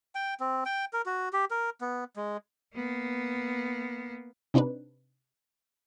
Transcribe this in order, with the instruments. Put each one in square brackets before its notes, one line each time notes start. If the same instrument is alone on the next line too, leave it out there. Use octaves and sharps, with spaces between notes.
[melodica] G5
C4
G5
A#4
F#4
G4
A#4
B3
G#3
[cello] A#3 B3
[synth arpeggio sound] C3 C4 D4 D#4 B4